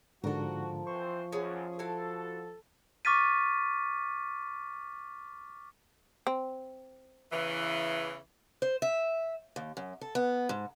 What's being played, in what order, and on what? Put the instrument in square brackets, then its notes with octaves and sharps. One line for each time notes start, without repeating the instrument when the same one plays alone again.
[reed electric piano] G#2 D3 [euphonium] F3 [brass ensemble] F#4 [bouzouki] A4 A#4
[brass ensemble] E3 C4 C5 [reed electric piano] C#6
[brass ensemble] F#2 [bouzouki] C#4 G#4
[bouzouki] E4 F#4 F5 [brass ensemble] A4
[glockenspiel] C#6 D6 F6 A6 B6 D#7
[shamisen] C4
[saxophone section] E2 C#3 E3
[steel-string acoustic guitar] C5
E5
D#2
F#2
A4
B3
G#2